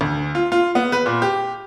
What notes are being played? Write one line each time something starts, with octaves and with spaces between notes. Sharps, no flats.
D2
F4
F4
B3
B4
A#2
G4